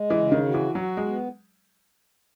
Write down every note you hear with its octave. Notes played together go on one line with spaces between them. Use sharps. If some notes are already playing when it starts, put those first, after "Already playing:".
Already playing: G#3
E3
C#3
D#3
F#4
E3
F#3 F#4
G#3
B3